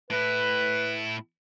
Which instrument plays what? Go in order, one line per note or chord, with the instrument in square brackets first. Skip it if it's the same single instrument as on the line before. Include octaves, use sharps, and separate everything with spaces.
[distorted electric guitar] A2 E4 [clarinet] B4